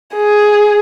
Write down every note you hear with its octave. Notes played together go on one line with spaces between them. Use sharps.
G#4